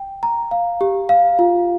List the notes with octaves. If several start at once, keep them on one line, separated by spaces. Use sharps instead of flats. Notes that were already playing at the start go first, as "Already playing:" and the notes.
Already playing: G5
A#5
F5
G4
F5
F4